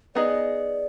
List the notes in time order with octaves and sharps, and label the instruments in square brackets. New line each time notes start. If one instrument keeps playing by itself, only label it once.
[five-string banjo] B3 D#4 G#4 D#5 [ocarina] D5